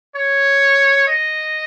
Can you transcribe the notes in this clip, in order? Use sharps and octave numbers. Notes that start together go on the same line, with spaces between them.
C#5
D#5